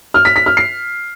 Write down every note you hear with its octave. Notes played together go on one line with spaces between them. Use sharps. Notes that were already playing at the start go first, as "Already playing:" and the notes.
F6
B6
B6
F6
C7